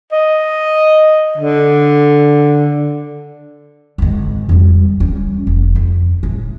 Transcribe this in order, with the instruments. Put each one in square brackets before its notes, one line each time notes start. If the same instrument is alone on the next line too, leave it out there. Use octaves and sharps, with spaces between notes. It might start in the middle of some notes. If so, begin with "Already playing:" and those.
[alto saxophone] D#5
D3
[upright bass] G#1 D#3
F2 G3
G3 C#4
F1
F2
A2